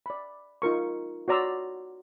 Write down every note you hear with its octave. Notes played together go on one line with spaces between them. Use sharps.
D5 B5
D#4 F4 A#4 C#6
F#4 C#5 D5 A#5 C6 E6